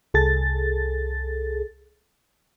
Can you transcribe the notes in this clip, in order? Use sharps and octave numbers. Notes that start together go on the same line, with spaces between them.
C2 G#4 A4 A6